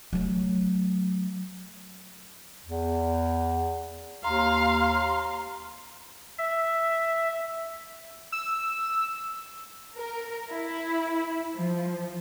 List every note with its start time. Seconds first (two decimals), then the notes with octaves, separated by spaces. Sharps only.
0.13 F#3 A3
2.65 E2
4.24 D#2 F5 A#5 C6
6.38 E5
8.32 E6
9.95 A#4
10.50 E4
11.55 F3